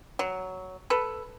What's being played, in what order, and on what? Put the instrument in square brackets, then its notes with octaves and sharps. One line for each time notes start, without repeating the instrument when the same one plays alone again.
[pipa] F#3
A4 B4